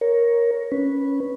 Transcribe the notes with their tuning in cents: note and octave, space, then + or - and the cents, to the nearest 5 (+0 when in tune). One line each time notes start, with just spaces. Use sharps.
A#4 +10 C#5 +0
C#4 +0 B4 -10